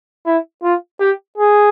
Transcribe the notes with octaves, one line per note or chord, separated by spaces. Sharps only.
E4
F4
G4
G#4